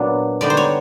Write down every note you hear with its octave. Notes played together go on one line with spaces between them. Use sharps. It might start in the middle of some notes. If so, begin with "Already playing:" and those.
Already playing: A#2 F#3 B3 D4
D3 G3 B3 D#4 D5
C5
C#5